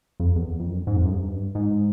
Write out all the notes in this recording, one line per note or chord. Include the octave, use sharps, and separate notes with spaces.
F2
E2
F2
F#2
G#2
F2
F#2
G2
G#2